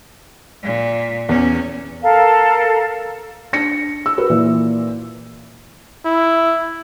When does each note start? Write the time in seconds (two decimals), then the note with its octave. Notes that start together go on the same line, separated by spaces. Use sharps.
0.63 A#2
1.29 E2 C#4
2.02 A4 A#4 F5
3.53 D4 A#6 C#7
4.06 E6
4.18 F#4 A#4 B4
4.30 A#2 E3
6.05 E4